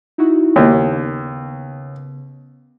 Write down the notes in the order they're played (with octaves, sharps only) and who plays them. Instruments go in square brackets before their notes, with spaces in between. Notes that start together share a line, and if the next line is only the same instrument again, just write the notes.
[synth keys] D#4 E4 F#4
[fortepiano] D#2 [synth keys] C#3 B3